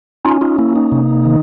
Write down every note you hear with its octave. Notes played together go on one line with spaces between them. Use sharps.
C#4 D#4 F4
D#4 F4
A#3 E4
D#4
C3
D#3